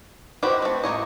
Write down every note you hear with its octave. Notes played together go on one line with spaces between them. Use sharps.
E4 F#4 G4 B4 C5 D#5
A3 C4
A1 A#3 C#5 D#5